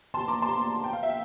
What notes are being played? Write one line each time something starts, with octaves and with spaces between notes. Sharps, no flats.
A5 C6
A#5 D6
A5 C6
G5
F5
E5